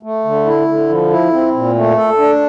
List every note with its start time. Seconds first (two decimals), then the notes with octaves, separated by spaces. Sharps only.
0.03 A3
0.25 D3
0.46 E4
0.68 D3
0.89 F3
1.10 E4
1.32 C4
1.54 A#2
1.75 A3
1.97 A4
2.18 D4